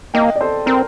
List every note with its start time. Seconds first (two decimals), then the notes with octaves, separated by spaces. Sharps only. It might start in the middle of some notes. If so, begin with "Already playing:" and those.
0.14 A#3 D#5 G5
0.36 D5
0.41 A4 C5
0.66 C4 A#4